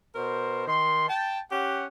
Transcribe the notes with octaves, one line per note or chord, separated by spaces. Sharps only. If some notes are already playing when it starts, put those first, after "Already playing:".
B2 A#4 C5
D#3 C6
G5 A5
C#4 G4 F#5